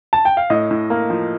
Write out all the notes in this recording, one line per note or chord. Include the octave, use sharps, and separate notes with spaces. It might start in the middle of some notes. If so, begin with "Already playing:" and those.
A5
G5
F5
A2 D#5
A2
A#3
F3